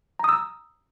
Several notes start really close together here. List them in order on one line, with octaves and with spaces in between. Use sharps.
A#5 D#6 E6